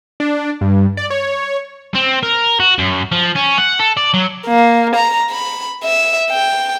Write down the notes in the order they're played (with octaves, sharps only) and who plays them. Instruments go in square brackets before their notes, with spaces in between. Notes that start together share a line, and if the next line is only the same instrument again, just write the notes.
[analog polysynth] D4
G2
D5
C#5
[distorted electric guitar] C4
A#4
F#4
F#2
F3
C#4
F#5
A4
D5
F#3
[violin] A#3
A#5
B5
E5
G5